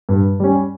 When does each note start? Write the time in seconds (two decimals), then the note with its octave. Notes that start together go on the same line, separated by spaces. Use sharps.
0.09 G2
0.40 G3 C#4